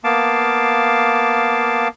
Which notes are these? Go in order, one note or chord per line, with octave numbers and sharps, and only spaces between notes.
A#3 B3 F5 A5 D6